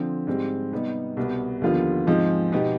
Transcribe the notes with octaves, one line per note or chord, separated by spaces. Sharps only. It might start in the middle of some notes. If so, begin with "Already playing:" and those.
Already playing: D3 F3 C4
G#2 G3 C4
C3 G3 B3 D#4
C2 B2 B3
D#2 D3 F3 B3 F4
G#2 F3 G#3 C4 D#4
B2 B3 D#4 G4